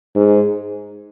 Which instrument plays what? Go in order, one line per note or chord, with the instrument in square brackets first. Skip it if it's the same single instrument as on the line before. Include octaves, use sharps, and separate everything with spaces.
[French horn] G#2